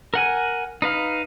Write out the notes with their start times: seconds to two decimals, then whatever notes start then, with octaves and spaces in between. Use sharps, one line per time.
0.14 A#4 F#5 G#5
0.82 D#4 B4 F5